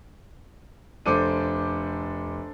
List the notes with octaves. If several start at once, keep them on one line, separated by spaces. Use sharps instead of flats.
F1 D4 A4 C5 D6 D#7